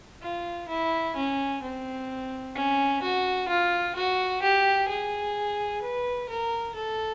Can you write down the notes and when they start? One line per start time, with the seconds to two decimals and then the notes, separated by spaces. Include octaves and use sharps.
0.22 F4
0.68 E4
1.16 C#4
1.63 C4
2.55 C#4
3.02 F#4
3.48 F4
3.96 F#4
4.42 G4
4.88 G#4
5.82 B4
6.29 A#4
6.75 A4